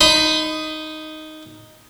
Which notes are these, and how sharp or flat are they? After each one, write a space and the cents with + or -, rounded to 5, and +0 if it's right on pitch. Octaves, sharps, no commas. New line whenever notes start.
D#4 +0 B5 +30